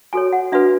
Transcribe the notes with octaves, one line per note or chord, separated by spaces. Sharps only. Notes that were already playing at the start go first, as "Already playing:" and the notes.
F#4 A4 C#5 G#5
F#5
D4 F#4 B4 E5